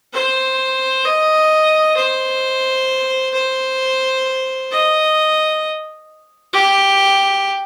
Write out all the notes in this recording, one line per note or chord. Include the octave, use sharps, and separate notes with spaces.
C5
D#5
C5
C5
D#5
G4